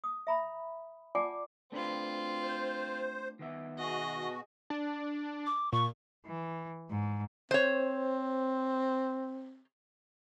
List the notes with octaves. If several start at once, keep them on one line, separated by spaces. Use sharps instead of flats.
D#6
E5 A#5 B5
F4 D5 F#5 G#5 A5 D6
A3 C4 D4 F4 B4
C5
D#3 B3 E5
B2 F#4 G#4 D#5
D4
D6
A#2 C#6
E3
G#2
C4 C5 C#5